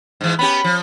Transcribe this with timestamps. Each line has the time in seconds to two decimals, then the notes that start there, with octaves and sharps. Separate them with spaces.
0.21 G#2 E3
0.39 B3 C#4 G4 B5
0.64 F3